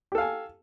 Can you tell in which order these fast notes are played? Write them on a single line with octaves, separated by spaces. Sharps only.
G4 A4 F5 G#5